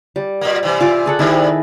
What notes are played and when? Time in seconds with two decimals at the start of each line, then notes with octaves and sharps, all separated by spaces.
0.16 G3
0.41 A#2 A#3
0.63 C3 E3
0.81 F4 D5
1.06 G#4 A4 F#5
1.19 B2 D#3 G3 E4